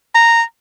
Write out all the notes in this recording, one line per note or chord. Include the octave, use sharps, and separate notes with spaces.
A#5